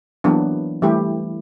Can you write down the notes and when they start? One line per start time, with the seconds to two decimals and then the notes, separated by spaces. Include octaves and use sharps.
0.24 E3 F#3 A#3 B3 D4
0.82 E3 G3 A3 E4 G4